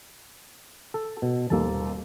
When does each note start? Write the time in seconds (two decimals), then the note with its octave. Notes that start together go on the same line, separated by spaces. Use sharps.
0.94 A4
1.22 B2
1.50 D#1 D#2 A#3 A4 A5